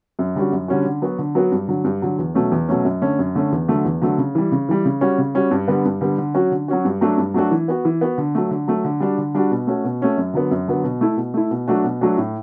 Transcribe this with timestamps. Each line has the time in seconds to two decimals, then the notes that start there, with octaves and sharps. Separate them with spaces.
0.19 F#2
0.35 D3 G3 C#4 F#4
0.52 F#2
0.68 D3 G3 C#4 F#4
0.85 D3
1.02 F#3 B3 F#4
1.19 D3
1.35 F#3 B3 F#4
1.52 G2
1.68 D3 F#3
1.84 G2
2.02 D3 F#3
2.18 E2
2.35 B2 F#3 A3 C#4
2.52 E2
2.68 B2 F#3 A3 C#4
2.85 F#2
3.01 D3 A3 C#4
3.19 F#2
3.35 D3 A3 C#4
3.52 E2
3.68 D3 F#3 A3
3.85 E2
4.02 D3 F#3 A3
4.18 C#3
4.35 E3 G3
4.52 C#3
4.69 E3 G3
4.85 C#3
5.01 G3 C#4 F#4
5.18 C#3
5.35 G3 C#4 F#4
5.51 G2
5.68 D3 G3 B3
5.85 G2
6.01 D3 G3 B3
6.18 D3
6.34 F#3 C#4 F#4
6.51 D3
6.68 F#3 C#4 F#4
6.85 G2
7.01 F#3 A3 D4 F#4
7.18 G2
7.34 F#3 A3 D4 F#4
7.51 E3
7.68 B3 F#4
7.85 E3
8.01 B3 F#4
8.18 D3
8.35 F#3 A3
8.51 D3
8.68 F#3 A3
8.84 D3
9.00 G3 D4 F#4
9.18 D3
9.35 G3 D4 F#4
9.51 B2
9.67 A3 C#4 F#4
9.84 B2
10.01 A3 C#4 F#4
10.17 F#2
10.34 D3 F#3 B3
10.51 F#2
10.68 D3 F#3 B3
10.84 B2
11.01 A3 E4
11.17 B2
11.34 A3 E4
11.51 B2
11.68 F#3 A3 D4 F#4
11.84 B2
12.01 F#3 A3 D4 F#4
12.18 A2